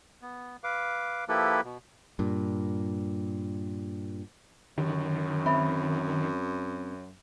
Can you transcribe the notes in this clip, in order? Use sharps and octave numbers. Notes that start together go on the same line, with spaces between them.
B3
B4 F5 D6
F3 A#3 E4 G4 A4 B4
B2
G2 A#2
F#2 D3 D#3 G4
C4 E5 B5